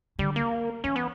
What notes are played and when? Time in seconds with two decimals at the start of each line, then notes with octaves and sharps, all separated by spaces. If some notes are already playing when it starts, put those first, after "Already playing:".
0.19 D3 G3
0.36 A#3
0.84 E3 C#4
0.96 B3